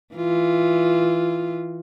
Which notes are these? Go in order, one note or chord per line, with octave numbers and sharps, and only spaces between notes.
E3 F4